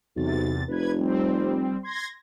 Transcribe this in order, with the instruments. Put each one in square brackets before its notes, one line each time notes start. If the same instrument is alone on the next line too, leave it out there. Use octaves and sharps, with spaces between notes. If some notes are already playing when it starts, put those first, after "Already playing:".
[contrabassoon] B1 [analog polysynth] E2 C3 A6
[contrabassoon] F1 [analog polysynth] B4 G#6
[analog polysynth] G3 C4
C6 G#6 A#6